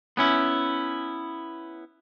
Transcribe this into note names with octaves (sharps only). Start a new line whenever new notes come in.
B3 C#4 E4